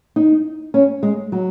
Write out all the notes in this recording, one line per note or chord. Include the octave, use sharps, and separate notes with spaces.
D#4
C#4
G#3
F#3